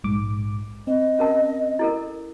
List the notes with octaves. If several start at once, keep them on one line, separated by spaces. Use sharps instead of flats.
A#1 G#2 D6
C4 D#5
C#4 A#4 A5
E4 A4 A#4